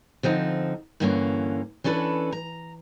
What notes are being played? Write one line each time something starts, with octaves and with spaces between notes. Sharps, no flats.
D3 F3 C4 D#4
G2 D3 E3 A#3 B3 C#4
E3 C#4 D4 A4 B4
A#5